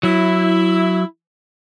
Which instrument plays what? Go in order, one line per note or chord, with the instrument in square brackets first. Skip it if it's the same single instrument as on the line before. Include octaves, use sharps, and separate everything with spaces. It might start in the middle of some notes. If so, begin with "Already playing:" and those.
[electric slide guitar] F#3 [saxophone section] E4